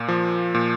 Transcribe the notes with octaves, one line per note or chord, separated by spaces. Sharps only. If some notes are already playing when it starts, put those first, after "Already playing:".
Already playing: A#2 A#3
F3
A#2